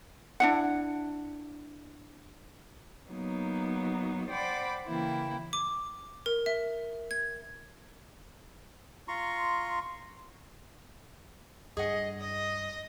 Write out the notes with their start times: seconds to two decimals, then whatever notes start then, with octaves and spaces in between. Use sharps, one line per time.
0.40 D4 E4 F#5
3.10 F#3 A#3 B3 D#4
4.30 C5 D5 F#5 G5 B5 D6
4.87 C#3 E3 A#3 E4 G5
5.53 D6
6.26 A#4
6.46 E5
7.11 G#6
9.08 F4 A#5 C6 C#6
11.77 G2 G#4 D#5 F#5
12.20 D#5 D#6